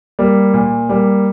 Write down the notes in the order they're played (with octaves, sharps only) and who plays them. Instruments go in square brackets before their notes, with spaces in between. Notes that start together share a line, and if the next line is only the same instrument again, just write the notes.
[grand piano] G3 A#3
A#2
G3 A#3